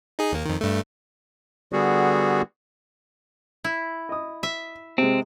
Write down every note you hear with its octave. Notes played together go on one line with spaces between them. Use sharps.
D#4 G#4
D#2 A#3
F2 D#3
G2 A3
D3 G3 B3 F#4 G#4
E4
D#5 D#6
E5
C3 G#3 C4